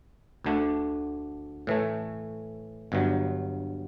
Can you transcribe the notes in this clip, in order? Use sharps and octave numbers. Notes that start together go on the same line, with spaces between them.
D2 D3 A3 D4
A2 E3 A3
G1 G2 F#3